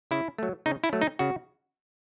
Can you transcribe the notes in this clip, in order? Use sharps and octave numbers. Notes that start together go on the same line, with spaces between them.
C#3 E4
F#3 A3
C#3 D#4
E4
F#3 A3
D#4
C#3 F#4